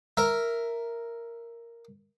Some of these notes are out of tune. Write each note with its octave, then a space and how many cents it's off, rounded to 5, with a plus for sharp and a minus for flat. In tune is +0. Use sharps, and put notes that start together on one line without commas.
A#4 +0 E5 +5